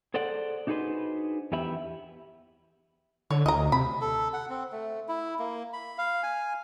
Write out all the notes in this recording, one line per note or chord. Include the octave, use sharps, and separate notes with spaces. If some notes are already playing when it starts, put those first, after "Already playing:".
G#4 A4 C5 D5 F#5
D4 D#4 F#4 G#4 B4 C5
E2 E3 B3 G4 E5 B5
D3 C#5
D2 D#5 A#5
C3 B5
A4
F#5
C4
A3
E4
A#3
B5
F5
G#5